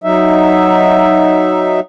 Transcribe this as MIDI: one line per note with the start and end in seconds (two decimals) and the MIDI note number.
0.04 1.80 54
0.04 1.80 63
0.04 1.80 76